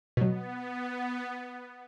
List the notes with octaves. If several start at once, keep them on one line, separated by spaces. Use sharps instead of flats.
B2 F#3 B3